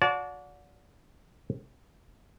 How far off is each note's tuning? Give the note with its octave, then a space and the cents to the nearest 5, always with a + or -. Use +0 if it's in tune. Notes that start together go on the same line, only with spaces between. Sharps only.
F#4 -35 D5 -30 A5 -25